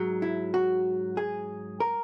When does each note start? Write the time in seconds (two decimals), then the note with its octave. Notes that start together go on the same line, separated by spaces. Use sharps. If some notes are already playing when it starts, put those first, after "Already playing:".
Already playing: G#2 F#3
0.22 E4
0.54 F#4
1.17 G#4
1.80 A#4